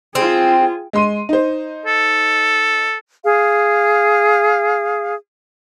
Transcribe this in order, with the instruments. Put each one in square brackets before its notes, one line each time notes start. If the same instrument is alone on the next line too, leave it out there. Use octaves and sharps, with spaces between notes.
[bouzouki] C4 [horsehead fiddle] F4 G#4
[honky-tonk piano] G#3 C6 D#7
D#4 C5
[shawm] A4
[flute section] G#4 F5